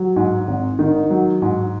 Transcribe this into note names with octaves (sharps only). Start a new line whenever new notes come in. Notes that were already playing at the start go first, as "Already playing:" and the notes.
Already playing: F#3
G#2
G#1
D#3
F#3
G#2